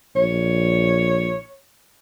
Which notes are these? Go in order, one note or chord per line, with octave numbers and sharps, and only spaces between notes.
A#1 C#5